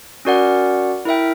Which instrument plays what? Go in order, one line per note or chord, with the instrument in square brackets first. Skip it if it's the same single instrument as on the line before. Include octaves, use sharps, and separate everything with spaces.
[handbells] C#4 F#4 A#4 D5 F#5
E4 A#4 E5 G5